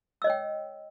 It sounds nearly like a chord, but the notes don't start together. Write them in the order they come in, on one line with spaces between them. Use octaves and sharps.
E6 D#5 C#5 G5